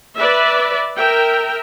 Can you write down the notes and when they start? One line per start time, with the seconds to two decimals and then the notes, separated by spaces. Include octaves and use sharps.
0.16 B4 D5 E5
0.96 A#4 E5 G5